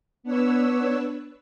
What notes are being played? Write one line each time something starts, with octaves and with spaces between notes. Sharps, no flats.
B3 D4 B4 C#5 E6